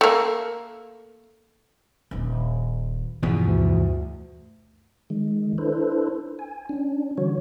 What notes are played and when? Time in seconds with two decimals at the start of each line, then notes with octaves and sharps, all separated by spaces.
0.01 A3 A#3
2.11 D#1 D4
3.23 E2 G2 B2 F3
3.44 D2
5.10 D#3 G#3
5.58 D4 E4 A4 B4 C5
6.39 G#5
6.69 C#4 D4
7.18 D3 E3 G3 F#4 C#5